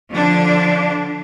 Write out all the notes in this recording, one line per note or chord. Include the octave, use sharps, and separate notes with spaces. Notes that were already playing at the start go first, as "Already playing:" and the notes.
D3 F3 D4